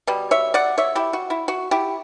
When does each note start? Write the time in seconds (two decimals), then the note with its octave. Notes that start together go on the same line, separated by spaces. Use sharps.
0.07 B2 G3
0.31 C#5 E5
0.54 D5 F#5
0.78 C#5 E5
0.95 E4 G4
1.13 F#4
1.30 E4
1.48 F#4
1.71 E4 G4